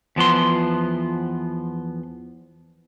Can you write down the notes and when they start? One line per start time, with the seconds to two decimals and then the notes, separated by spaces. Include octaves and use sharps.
0.16 E2 F3 B3 C6